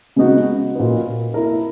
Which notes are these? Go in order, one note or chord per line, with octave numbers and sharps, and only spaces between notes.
C#3 G#3 B3 D#4 F#4
A#2 A#3 D#4 F#4 B4
A#3 E4 A#4